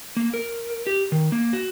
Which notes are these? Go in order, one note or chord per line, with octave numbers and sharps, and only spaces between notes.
A#3
A#4
G4
D#3
A#3
F#4